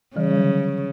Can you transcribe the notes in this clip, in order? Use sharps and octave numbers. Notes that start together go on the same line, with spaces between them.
C#3 E3 G3
G3
D3 F#3